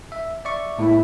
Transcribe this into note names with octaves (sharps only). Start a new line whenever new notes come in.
E5
D5 E5 C#6
A2 G#3 A#3 E4